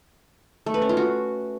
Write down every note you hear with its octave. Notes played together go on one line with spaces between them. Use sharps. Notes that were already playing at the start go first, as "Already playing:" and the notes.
A3
B4
C#4
F4
F#4